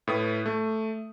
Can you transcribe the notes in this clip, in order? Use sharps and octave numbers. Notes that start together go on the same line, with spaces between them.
A2 B4 D#6
A3